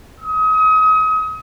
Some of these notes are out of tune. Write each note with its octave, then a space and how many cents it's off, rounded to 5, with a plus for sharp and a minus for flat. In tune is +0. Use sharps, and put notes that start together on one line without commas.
D#6 +35